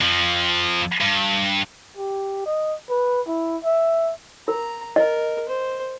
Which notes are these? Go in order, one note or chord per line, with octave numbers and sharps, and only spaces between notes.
F2 F3
G2
G4
D#5
B4
E4
E5
A#4 A#5
A#4 D#5
C5